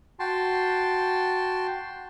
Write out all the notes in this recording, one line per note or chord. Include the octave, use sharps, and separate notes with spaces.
F#4 G5 A5 C6